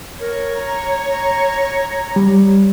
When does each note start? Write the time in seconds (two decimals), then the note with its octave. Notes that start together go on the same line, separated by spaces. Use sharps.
0.21 A#4 C#5
0.55 A#5
2.16 G3